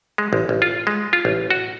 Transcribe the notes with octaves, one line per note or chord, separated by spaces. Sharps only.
G#3
A1
A1
F4
G#3
F4
A1
F#4